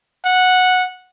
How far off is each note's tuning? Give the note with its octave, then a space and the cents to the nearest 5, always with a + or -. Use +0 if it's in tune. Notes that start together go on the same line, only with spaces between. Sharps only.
F#5 -10